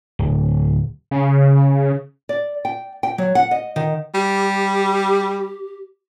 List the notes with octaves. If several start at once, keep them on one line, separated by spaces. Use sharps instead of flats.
D1
C#3
D5
G5
G5
F#3
F#5
D#5
D#3
G3 G4